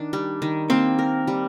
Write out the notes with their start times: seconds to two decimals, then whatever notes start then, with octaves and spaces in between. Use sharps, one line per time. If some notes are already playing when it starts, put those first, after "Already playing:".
Already playing: D#3 D4
0.13 G3
0.42 D#3
0.70 A#3 C4
0.99 A#4
1.27 G3